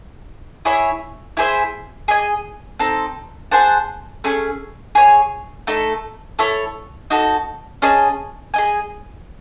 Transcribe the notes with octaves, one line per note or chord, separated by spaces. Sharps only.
E4 G#4 C#5 E5
E4 G#4 C5 E5
G#4 D#5 G#5
C4 D#4 A4
G#4 C5 F#5 A5
A3 C#4 G#4
G#4 C#5 G#5
A3 D#4 A4
E4 A4 C#5
D#4 F#4 A4
C#4 G#4 D#5 A5
G#4 D#5 G#5